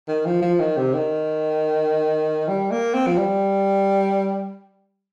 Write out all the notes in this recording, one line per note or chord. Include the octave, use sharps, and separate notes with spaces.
D#3
F3
F3
D#3
C3
D#3
G3
A#3
C4
F3
G3